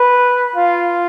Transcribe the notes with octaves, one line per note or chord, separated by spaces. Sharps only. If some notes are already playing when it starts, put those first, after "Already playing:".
Already playing: B4
F4